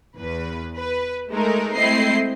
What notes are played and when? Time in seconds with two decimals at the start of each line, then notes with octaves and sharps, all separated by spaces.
0.19 E2 B4
0.76 B4
1.31 G#3 A3 D#4 A#4
1.75 G#3 A3 C4 E4 D#5 C7